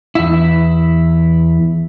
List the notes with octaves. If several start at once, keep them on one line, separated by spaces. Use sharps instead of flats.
E2 E4